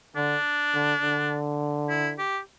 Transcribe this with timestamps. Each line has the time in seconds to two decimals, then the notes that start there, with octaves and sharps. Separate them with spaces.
0.16 D3 D4
0.74 D3
1.03 D3
1.89 E4
2.18 G4